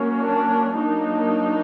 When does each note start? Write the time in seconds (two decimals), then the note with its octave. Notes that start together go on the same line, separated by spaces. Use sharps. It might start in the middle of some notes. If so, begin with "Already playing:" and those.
Already playing: F#3 A#3 C#4
0.21 D4
0.77 F#3 A#3 D4 D#4